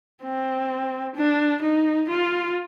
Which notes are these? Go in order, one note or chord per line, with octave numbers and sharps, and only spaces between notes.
C4
D4
D#4
F4